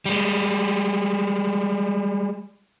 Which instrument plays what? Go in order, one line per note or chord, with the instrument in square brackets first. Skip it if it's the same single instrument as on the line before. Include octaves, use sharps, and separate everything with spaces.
[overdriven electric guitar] G3 G#3